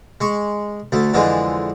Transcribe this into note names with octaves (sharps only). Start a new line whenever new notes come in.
G#3 C#6
D2 A3
F2 D3 E3 G#3